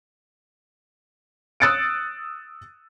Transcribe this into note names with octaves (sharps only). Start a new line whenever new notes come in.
D#6 E6 F#6 A6 C#7 D7